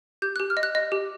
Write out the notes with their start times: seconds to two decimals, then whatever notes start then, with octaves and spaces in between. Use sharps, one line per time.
0.22 G4 G6
0.36 G4 F#6
0.50 F6
0.57 D#5
0.63 F#6
0.75 D#5
0.92 G4